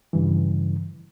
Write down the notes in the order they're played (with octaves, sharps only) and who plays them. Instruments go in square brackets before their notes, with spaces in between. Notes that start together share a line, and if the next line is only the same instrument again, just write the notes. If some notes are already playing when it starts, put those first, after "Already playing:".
[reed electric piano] G2 C#3 E3